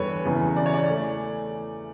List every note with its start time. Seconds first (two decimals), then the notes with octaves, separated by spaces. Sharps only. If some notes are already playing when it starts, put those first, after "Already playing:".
Already playing: E2 D3 G3 A4 B4 C#5
0.24 E1 E2 C#3 E3
0.57 D5
0.66 C#5
0.74 D5
0.89 E3 A3